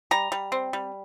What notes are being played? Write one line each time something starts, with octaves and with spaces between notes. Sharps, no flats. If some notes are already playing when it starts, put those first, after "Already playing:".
G3 A#5
G3
C4
G3